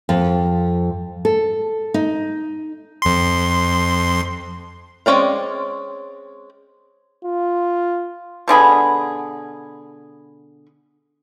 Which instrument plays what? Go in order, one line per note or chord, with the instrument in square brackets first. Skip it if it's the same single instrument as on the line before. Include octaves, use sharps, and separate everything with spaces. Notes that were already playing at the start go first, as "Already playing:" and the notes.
[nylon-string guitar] F2
A4
D#4
[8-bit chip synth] F2 C6
[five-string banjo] G#3 C4 C#4 D5 F5
[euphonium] F4
[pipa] B2 D3 G#4 B5